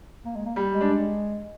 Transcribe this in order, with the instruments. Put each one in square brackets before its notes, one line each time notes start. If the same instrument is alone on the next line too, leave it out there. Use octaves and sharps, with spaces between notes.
[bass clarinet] A#3
G#3
A#3
[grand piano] G3
[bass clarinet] G#3
[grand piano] D4